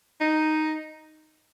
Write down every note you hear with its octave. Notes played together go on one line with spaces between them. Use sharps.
D#4